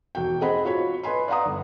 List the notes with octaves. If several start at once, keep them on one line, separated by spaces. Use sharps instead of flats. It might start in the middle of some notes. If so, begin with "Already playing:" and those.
E1 F#4 G5
C4 G#4 D#5 F#5 B5
F4 F#4 C#5 B5
B4 D#5 G#5 B5 C6
D5 F5 F#5 A#5 D#6
G1